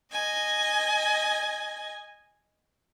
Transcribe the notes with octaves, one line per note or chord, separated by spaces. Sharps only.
D#5 G#5